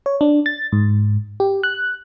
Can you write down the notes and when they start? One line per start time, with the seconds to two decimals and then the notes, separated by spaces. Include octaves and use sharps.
0.06 C#5
0.21 D4
0.46 A6
0.72 G#2
1.40 G4
1.63 F#6